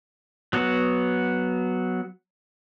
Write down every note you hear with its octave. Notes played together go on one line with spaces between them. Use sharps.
F#3 B3 F#4